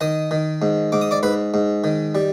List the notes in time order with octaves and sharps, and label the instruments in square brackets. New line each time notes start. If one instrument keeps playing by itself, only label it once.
[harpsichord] D#3 D#5 D#6
D#3
G#2
G#2 D6
D#6
D5 D6
G#2 B4 B5
G#2
D#3
G3